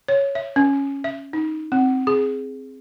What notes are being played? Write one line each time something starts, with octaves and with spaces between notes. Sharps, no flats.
C#5
E5
C#4
E5
D#4
C4
G#4